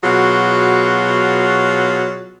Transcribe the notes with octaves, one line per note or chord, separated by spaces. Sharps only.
B2 F#3 F4 F#4 G#4